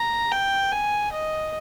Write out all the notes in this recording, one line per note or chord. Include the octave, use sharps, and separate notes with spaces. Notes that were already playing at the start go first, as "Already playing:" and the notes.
Already playing: A#5
G5
G#5
D#5